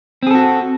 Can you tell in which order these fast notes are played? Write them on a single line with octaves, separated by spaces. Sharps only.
C4 G#4 A4 F#4